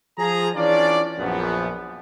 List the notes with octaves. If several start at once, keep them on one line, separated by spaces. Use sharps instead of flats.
F3 G#4 A#5
E3 C#4 D4 F4 D5
A#1 F#2 F3 B3